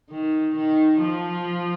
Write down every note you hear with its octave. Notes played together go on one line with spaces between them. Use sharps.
D#3
D#3
F3